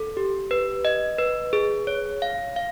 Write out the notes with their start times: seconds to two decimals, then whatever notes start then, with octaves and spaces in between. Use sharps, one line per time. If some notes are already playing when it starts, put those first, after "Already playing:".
Already playing: A4
0.17 G4
0.51 B4
0.85 D#5
1.19 B4
1.53 G#4
1.87 C#5
2.22 F5
2.56 F5